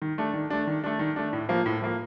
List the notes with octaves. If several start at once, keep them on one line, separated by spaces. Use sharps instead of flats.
D#3
A3 D4
D#3
A3 D4
D#3
A3 D4
D#3
A3 D4
A2
F3 A#3
A2
F3 A#3